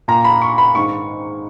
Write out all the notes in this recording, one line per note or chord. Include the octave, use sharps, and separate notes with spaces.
A#2 A#5
B5
C#6
B5
G#2 D#3 C#6